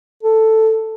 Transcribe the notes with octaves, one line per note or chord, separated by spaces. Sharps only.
A4